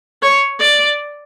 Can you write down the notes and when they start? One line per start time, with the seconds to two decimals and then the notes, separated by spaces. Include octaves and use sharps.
0.22 C#5
0.60 D5